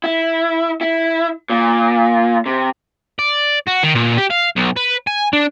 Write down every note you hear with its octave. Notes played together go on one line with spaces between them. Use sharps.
E4
E4
A#2
C3
D5
F#4
D#3
A#2
G4
F5
B1
B4
G#5
D4